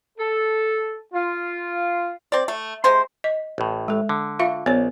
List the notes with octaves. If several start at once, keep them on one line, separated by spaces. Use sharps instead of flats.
A4
F4
C4 D5
A3
C3 G#3 C5 C6
D#5
A1 A2
G#3 A4
D3
F4 E5 F5
A#1 B3 C#5